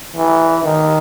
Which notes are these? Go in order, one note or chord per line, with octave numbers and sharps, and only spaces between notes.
E3
D#3